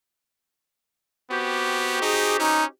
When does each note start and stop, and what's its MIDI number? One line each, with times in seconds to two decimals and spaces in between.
1.31 2.00 59
1.31 2.69 60
1.31 2.69 66
1.31 2.69 67
2.02 2.39 63
2.02 2.36 68
2.40 2.65 61
2.40 2.64 63